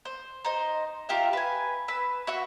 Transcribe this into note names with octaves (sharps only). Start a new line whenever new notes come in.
C5
D#4 C5
F4 G4 A#4 E5
B4 G#5
B4 E6
F#4 E5 C#6